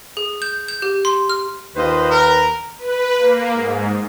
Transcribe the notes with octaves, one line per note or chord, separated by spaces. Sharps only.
G#4
G6
G6
G4
C6
F6
D#2 F4 B4 C5 D#5
A#4
B4
A#3
G#2